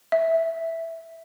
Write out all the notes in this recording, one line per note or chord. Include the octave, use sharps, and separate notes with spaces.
E5